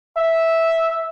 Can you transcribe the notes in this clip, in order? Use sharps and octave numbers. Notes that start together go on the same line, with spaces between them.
E5